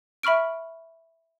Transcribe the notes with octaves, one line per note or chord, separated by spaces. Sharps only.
E5 B5 C#6 F6 D7